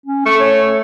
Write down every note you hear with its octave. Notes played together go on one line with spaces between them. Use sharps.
C#4
A3 C#6
C#5